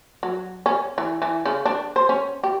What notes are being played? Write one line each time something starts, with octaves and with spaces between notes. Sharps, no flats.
F#3
C#4
E3
E3
C#3
D4
C5
C#4
G4